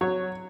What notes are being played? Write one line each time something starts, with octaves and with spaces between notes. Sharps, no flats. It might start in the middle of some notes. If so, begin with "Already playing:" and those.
F#3 C#5